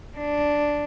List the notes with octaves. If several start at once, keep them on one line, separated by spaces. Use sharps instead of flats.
D4